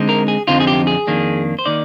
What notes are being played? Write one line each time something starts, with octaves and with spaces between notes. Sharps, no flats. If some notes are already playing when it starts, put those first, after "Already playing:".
Already playing: D3 G#3 C4 D#4
A#4
G#4
F2 D3 F3 C4 D#4 F4
G#4
G4
G#4
F2 D#3 A#3 D4
C5
D#3 A#3 D#4 D5